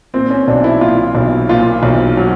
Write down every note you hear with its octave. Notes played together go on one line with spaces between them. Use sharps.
A#2 C4
C#4
B1 D4
E4
A#2 F4
B1
A#2 F4
B1
F#3